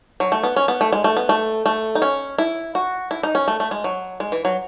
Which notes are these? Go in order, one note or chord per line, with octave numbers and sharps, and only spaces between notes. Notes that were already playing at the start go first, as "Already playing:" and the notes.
F#3
A3
B3
C#4
B3
A3
G#3
A3
B3
A3
A3
D#4
C#4
E4
F#4
E4
D#4
C#4
A3
A3
G#3
F#3
G#3
E3
F#3